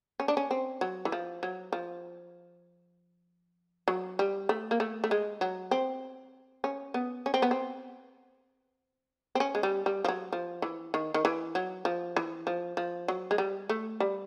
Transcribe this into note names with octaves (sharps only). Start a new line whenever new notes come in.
C#4
D4
C#4
C4
F#3
E3
F3
F#3
F3
F#3
G3
A3
A#3
A3
A3
G#3
F#3
C4
C#4
B3
C#4
C4
B3
C4
C4
C#4
G#3
G3
G3
F3
F#3
F3
E3
D#3
D#3
E3
F#3
F3
E3
F3
F3
F#3
G#3
G3
A3
G3